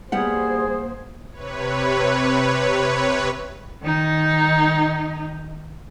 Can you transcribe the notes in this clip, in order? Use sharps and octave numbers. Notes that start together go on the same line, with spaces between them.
G3 A#3 B3 G#4 C5 F#5
C3 B4 C#5
D#3 D#4